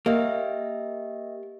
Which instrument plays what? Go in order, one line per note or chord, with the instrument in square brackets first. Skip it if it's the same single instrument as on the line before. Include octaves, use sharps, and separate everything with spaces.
[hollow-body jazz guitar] A#3 [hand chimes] G4 D#5 E5